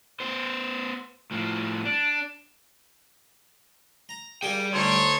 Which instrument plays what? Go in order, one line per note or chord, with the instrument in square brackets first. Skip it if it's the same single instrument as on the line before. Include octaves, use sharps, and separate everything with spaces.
[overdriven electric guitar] B3 C5
A2 F3
D4
[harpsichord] A#5
[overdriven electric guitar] G3 G5 [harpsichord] A#3 G4 G#4
[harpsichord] D2 [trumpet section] D#4 A4 C#5 [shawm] C6